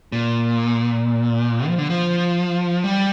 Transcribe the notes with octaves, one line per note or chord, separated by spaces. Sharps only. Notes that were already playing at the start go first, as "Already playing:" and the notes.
A#2
F3
D3
F3
G3